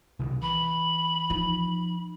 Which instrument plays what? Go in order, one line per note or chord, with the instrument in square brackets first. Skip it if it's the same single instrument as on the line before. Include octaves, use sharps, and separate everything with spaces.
[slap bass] C2 B2 D#3
[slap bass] E3 [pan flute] B5
[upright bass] F3 D#4